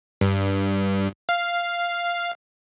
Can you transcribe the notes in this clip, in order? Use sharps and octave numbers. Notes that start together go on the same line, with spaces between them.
G2
F5